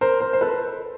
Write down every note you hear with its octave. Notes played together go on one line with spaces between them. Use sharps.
A#4 C5
A#4 C5
C5
A4 B4